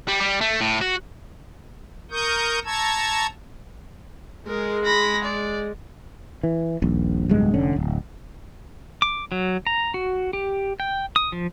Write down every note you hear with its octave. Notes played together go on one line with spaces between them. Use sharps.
G3
G3
A3
A2
F#4
A#4 C#6 D#6 G6
A5 A#5 C#6 E6 G#6
G#3 A#4
B5 A#6
D5
E3
D#1 A#1
D1 B1 G2 G#3
F1 D3 C#4
D1
D6
F#3
A#5
F#4
G4
G5
D#6
F3